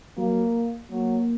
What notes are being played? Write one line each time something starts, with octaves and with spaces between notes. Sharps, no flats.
F#3 A#3
F#3 A#3